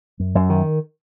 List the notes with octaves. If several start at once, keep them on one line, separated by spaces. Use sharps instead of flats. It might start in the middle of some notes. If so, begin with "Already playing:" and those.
F#2
F#2
D#3